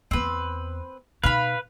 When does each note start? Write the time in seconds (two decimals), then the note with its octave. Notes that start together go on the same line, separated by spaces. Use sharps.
0.11 E2 B3 C4 B4
1.23 B2 D#4 B4 F5 B5